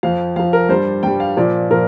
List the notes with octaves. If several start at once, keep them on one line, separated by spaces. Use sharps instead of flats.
F2 F3 F5
F2 F3 F5
A#4
G2 G3 C5
G2 G3 G5
F5
A#2 F3 D5
A#2 F3 A#4